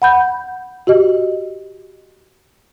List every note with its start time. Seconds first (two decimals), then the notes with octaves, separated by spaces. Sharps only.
0.02 F#5 B5 G6
0.87 F#4 G4 D#5